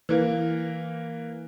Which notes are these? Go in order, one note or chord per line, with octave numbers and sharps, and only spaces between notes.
E3 A#3